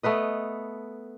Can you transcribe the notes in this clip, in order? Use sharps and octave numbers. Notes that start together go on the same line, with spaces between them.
A3 B3 B4 D#5